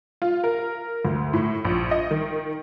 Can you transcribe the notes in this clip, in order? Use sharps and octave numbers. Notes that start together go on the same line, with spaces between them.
F4
A#4
D2
A2
A#1
D#5
D#3